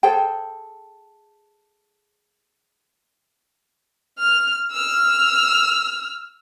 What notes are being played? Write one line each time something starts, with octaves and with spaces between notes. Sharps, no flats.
G#4 A4 C5 G5
F6
E6 F6